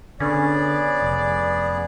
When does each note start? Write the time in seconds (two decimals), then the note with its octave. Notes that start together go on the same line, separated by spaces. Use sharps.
0.20 D3 B3 C#4 G#4 D5
1.02 F1